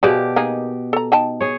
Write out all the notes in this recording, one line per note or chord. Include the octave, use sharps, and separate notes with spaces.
B2 F3 G4 G#4 D5
A#3 D#4 G#4
A4 A#5
D#4 G5 A5
G#4 C#5